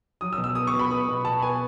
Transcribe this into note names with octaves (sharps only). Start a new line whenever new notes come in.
F#3 D#6
E6
B2
E6
B3 D#6
C#6
B2
B5
B3 D#6
B2
B2 A5
B3 G#5